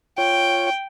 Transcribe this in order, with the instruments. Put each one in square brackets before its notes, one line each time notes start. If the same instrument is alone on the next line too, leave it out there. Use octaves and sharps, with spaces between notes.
[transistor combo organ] F4 C#5 [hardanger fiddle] G5